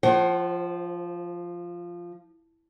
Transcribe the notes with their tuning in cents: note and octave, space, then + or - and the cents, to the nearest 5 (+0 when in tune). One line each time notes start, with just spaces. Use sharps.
F3 -5 C5 +30 F#5 +40